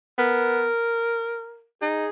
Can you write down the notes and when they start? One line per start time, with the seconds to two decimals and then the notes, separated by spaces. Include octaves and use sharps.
0.18 B3 A#4
1.81 D#4 G#4